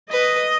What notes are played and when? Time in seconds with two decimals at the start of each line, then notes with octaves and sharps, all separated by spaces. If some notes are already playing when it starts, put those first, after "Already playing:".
0.11 B4 D#5